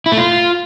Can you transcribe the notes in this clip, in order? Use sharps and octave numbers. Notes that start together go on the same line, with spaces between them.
E4
A3
F4